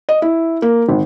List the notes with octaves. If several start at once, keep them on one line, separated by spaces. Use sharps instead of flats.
D#5
E4
A#3
G#1